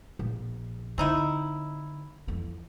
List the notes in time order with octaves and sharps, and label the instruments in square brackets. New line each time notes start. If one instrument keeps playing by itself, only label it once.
[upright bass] A#1
[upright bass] D3 [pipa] C4 D#4 E4
[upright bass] F2 E3